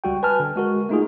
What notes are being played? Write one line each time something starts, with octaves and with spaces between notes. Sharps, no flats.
C#2 G3 F#4 G5
B4 G#5 A5 F6
D3
G#3 F#4 A#4
A3 A#3 D#4 F4 F#4 G#4